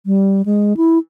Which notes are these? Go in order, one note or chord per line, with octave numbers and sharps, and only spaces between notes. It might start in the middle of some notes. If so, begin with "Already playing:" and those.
G3
G#3
E4